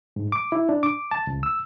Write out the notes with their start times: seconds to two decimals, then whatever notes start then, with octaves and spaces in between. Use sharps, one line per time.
0.16 G#2
0.32 D6
0.52 E4
0.69 D4
0.83 D6
1.11 A5
1.27 C#2
1.43 E6